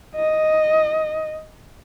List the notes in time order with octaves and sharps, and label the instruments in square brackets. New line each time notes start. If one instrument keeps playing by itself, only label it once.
[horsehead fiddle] D#5